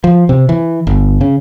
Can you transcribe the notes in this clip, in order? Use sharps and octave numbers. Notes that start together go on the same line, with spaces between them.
F3
C3
E3
G1
C#3